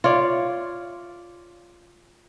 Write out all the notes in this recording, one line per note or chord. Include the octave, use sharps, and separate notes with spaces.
F4 C#5 D5